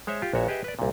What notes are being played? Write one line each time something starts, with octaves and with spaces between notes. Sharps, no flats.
G#3 C5 C#5 E5
F4 G4
A#1 A#2 F#4 C#5 E5
G4 G#4 B4 D#5 E5 F#5
B4 D5
C2 A#2